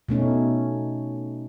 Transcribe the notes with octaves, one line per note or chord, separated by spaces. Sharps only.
B2 A3 C#4 D#4